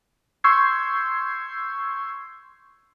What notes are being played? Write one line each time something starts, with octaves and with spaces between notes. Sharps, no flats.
C6 C#6 E6 G6 G#6 C7